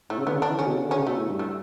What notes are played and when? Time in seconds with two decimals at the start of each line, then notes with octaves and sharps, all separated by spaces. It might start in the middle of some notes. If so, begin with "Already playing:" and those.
0.10 A2 A3
0.18 C#3
0.26 D3 B3
0.35 C#3
0.42 D3 D4
0.50 E3
0.59 D3 C#4
0.67 B2
0.75 C#3
0.85 D3
0.91 C#4
0.96 C#3
1.07 B2 A3
1.17 A2
1.29 G2
1.39 A3